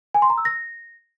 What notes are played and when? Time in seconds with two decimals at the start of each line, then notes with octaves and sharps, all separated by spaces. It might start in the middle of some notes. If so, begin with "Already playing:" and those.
0.14 G#5
0.22 C6
0.30 A#5
0.38 E6
0.45 A#6